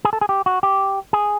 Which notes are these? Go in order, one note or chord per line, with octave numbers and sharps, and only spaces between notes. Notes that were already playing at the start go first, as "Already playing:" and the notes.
G#4
A4
G#4
G4
F#4
G4
G#4